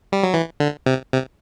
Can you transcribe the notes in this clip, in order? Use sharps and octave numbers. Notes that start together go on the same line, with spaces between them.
G3
F#3
E3
D3
C3
C3